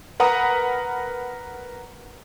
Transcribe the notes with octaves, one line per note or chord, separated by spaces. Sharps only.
A#4 B4 F#5 A#5 B5 D#6